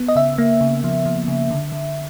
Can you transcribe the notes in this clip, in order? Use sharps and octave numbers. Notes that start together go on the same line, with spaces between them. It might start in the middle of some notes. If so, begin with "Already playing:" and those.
Already playing: B3
D#5
C#3 E5
A#3
C#3
F3
F3
C#3
D3
D3